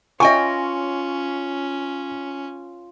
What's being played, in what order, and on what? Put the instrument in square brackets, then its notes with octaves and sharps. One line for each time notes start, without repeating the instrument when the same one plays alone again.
[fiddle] C#4 [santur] F4 B4 C#5 [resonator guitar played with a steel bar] D#5 G5 G#5 [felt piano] C#6